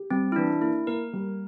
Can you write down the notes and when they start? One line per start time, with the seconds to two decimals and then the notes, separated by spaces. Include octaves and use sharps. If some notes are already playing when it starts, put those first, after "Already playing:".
Already playing: G4
0.11 G3 C4
0.32 E4
0.36 E3 D4
0.62 A#3 E4
0.87 A#3 A#4
1.13 G3